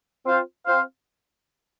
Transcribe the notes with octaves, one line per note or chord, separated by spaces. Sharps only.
C4 F4 C5 F5
C4 F4 C5 F5